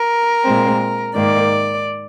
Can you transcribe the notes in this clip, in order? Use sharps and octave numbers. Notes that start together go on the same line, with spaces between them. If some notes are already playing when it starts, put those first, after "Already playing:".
Already playing: A#4
A#2 G#3 C4
G#2 D#3 A#3 D5